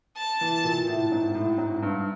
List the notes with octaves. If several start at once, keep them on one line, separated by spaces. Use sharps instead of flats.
A5
E3
A#2
A2
G#2
A2
G#2
G2